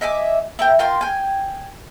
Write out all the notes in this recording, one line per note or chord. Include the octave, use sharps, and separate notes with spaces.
D#5 E5 G#5 D6
E4 A#4 G5
F4 A#4 G5 C6
G5 G#5